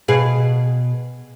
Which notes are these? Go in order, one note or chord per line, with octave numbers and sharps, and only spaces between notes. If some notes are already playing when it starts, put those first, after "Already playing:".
B2 G#4 F5